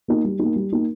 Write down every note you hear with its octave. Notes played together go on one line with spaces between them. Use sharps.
A#3 D#4
G3
A#3 D#4
G3
A#3 D#4